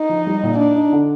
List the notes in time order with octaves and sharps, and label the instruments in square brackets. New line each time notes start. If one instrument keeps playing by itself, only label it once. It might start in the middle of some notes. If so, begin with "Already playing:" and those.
Already playing: [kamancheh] D#4
[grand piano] F3
G3
A#2
[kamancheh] D4 [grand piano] D#4
[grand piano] D#4
D3